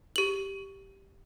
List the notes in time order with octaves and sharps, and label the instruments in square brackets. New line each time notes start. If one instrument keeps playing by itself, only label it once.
[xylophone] G4 F#7